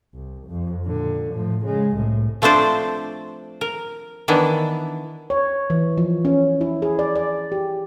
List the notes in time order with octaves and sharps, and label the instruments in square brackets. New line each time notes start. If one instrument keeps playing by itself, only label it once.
[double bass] C2
F2
A#2 D3
A2 F3
C#3 G#3
C2 A2
[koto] F3 A3 C4 D4 C5 D5
A#4
D#3 E3 B3 D4 E4
[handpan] C#5
E3
F3
C#4
E4
G#4
D5
D5
G4